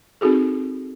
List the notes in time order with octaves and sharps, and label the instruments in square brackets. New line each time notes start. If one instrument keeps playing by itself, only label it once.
[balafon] C4 D#4 F#4 G#4 A4